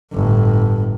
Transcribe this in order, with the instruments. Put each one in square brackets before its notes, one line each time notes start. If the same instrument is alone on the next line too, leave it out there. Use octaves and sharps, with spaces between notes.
[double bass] G1 A2